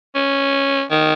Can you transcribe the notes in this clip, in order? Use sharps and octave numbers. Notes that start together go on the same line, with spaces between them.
C#4
D#3